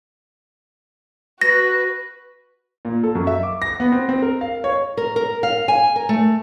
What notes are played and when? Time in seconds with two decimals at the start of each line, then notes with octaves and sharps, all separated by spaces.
1.41 F#4 B4 A#6
2.85 A#2
3.03 A4
3.15 F#2
3.27 E5
3.43 D6
3.62 A#6
3.80 B3
3.92 C4
4.09 C4
4.22 A#4
4.41 F5
4.64 C#5
4.97 A#4
5.16 A#4
5.43 F5
5.68 G#5
5.96 A#4
6.09 A3